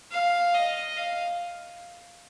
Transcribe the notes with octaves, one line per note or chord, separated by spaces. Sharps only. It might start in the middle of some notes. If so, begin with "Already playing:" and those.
F5
D#5
F5